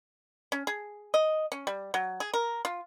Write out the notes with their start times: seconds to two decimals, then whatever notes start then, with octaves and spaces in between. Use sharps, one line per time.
0.52 C#4
0.67 G#4
1.14 D#5
1.52 C#4
1.67 G3
1.94 F#3
2.20 G#4
2.34 A#4
2.65 F4